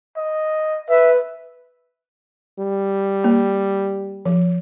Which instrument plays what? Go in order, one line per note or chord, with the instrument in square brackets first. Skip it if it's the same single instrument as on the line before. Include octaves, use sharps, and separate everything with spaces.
[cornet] D#5
[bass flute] B4 [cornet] E5
[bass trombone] G3
[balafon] A#3
F3